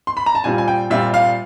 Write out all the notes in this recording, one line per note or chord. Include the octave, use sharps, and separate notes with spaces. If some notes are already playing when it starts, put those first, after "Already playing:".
C6
B5
A#5
A5
A#2 G3 C4 F4 G#5
G#5
G5
A#2 G3 C4 F4 E5
F5